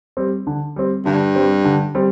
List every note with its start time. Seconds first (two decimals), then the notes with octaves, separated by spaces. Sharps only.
0.17 G3 C4
0.47 D3
0.76 G3 C4
1.05 G2 D3
1.35 G3 C4
1.65 D3
1.95 G3 C4